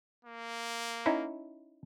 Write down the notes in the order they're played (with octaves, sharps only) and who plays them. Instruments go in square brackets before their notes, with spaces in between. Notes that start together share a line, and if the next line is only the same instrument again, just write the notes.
[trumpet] A#3
[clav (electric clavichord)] C#4 D#4 E4